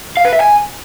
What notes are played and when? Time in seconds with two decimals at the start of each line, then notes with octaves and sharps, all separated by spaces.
0.17 F5
0.25 B4
0.33 E5
0.40 G#5